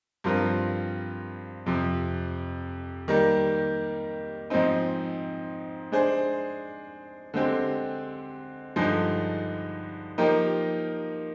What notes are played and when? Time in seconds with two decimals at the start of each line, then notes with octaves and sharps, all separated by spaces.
0.24 G2 F3 C4 F4 A#4
1.66 F2 C3 F3
3.08 D#3 G3 A#3
4.50 G#2 F3 C4 D#4
5.92 G#3 D4 G#4 C5
7.34 D3 G#3 C4 G4
8.76 G2 D3 F3 G#3 D#4
10.18 F3 A#3 D#4 G4 A#4